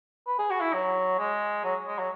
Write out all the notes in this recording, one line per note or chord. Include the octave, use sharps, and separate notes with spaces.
B4
G#4
F#4
E4
F#3
G#3
F#3
G#3
F#3